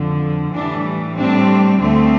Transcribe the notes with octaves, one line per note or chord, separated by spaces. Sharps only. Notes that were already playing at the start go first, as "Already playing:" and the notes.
Already playing: F2 D3 F3
A2 E3 G3 D4
A2 G3 C4 D4
D2 D3 A3 C4